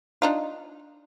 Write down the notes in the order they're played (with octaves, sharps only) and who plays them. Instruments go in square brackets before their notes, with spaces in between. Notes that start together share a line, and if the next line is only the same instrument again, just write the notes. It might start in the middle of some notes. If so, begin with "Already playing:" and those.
[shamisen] D4 D#4 F4